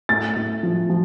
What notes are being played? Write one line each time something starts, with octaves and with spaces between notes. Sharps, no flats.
A2 A6
A2
F3
F3